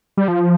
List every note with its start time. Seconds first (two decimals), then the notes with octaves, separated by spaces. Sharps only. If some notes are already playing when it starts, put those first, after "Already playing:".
0.17 G3
0.28 F3